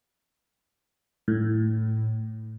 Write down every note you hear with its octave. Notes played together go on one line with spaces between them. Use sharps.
A2